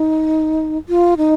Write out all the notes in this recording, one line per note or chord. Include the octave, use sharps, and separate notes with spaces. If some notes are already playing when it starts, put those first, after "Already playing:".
Already playing: D#4
F4
D#4